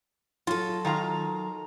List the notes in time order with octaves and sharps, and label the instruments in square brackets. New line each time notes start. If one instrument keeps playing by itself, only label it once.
[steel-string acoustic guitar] F#3 A4 [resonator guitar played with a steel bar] F4
[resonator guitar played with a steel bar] D#3 F4 A#5